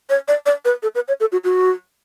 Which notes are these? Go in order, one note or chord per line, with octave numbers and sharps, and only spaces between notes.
C#5
D5
D5
B4
A4
B4
C#5
A4
F#4
F#4